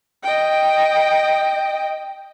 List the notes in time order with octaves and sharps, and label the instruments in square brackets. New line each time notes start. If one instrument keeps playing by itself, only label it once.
[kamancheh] D#5 G5